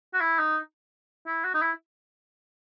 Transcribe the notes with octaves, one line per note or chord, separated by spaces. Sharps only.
F#4
E4
D#4
E4
F#4
D#4
E4